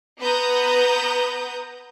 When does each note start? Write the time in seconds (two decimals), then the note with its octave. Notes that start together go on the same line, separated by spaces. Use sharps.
0.20 B3 B4 F#5 A#5 D#6 G6